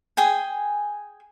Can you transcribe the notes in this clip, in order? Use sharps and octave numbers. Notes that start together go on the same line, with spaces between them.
G#4 G5 G#5